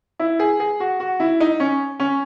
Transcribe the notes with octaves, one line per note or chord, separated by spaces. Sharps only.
E4
G#4
G#4
F#4
F#4
E4
D#4
C#4
C#4